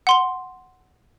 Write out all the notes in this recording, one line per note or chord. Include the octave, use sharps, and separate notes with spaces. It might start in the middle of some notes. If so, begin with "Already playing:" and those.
F#5 C6 G7